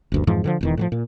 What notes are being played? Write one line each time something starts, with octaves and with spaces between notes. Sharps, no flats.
F#1 D2 G2
F2 G#2 E3 F3
D3 D#3 F3
E1 E2 D#3
A2 E3 F3
A#2